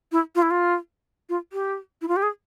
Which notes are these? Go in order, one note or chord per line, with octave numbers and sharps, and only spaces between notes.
E4
F4
E4
F4
F4
G4
E4
F4
G4
G#4